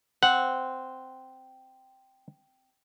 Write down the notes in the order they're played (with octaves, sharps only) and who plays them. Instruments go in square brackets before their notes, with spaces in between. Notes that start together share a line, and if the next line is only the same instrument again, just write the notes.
[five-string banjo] C4 [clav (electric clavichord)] F#5